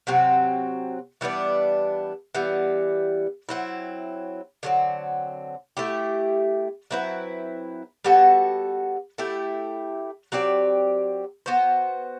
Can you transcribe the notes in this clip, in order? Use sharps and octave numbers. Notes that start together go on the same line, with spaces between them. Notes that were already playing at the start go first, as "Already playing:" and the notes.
C3 F#3 C4 F#4
E3 G3 B3 D4
E3 G3 B3
F#3 C4 E4
D3 F#3 C4
A3 E4 G4
F#3 C4 E4 B4
G3 B3 F#4 A4
A3 E4 G4
F#3 C4 G4 D5
B3 F#4 C5